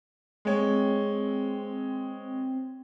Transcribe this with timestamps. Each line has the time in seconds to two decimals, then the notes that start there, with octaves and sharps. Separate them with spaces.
0.45 G#3 C4 C#5